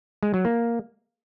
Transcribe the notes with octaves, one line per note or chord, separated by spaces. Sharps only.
G#3
F#3
A#3